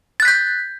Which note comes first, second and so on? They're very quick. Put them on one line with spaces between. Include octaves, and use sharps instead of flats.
A6 F#6 B6 G6